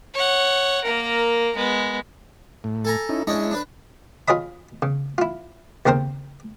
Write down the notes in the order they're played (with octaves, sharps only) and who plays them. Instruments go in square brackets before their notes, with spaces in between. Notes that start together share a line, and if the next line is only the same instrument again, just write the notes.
[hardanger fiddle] C#5 F#5
A#3 A#4
G#3 B3
[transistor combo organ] A2
[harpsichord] A4 G#5 A#5
[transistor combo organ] C#4 D#4 E4
[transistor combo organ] G#3 E4 [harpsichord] C#4 D4 D#5
[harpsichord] D4 B4
F4 G#4 C#5 D#5 B5
C#3
E4 F4
D#2 C#3 C4 A#4 C5